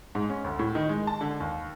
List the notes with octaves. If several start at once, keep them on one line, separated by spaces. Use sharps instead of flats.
G#2
C#4
D2
A2
D#3
G#3
A5
D3
D#2